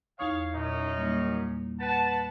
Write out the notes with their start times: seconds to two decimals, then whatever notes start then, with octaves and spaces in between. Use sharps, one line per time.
0.19 E2 D#4 C#5 F5 D#6
0.54 F#2 A#2 C#4 D#4
0.95 G3 A#3
1.80 B4 F#5 A5